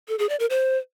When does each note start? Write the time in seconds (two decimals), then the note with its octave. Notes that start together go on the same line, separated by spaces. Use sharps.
0.08 A4
0.19 G#4
0.29 D5
0.40 A#4
0.50 C5